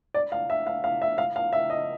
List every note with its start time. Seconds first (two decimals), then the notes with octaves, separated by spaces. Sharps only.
0.14 D5
0.32 F5
0.50 E5
0.67 F5
0.84 F5
1.02 E5
1.18 F5
1.36 F5
1.53 E5
1.70 D#5